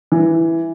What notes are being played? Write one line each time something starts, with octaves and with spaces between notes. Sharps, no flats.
E3